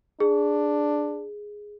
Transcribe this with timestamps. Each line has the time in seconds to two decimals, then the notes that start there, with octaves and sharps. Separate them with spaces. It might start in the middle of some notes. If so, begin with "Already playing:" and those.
0.20 D4 G#4